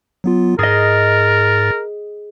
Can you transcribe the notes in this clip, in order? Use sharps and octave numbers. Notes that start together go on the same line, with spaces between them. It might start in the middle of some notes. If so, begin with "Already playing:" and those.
F#3 B3 F4
G#2 G#4 A#4 D#5 A6